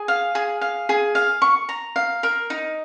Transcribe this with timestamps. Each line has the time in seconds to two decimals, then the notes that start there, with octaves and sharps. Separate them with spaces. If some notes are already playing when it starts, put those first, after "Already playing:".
Already playing: G#4
0.08 F5
0.35 G#4
0.61 F5
0.89 G#4
1.15 F5
1.42 C#6
1.69 A#5
1.96 F5
2.23 A#4
2.50 D#4